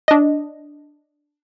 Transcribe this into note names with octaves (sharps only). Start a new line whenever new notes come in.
D4 D#5